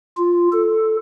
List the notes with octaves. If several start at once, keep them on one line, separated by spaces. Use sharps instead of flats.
F4
A4